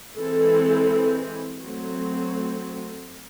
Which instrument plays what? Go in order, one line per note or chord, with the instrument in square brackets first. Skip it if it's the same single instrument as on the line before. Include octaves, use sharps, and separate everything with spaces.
[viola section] E3 G#3 C4 A4
F#3 A3 C4